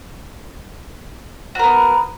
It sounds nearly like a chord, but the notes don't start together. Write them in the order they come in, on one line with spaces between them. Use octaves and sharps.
F#4 A#4 B3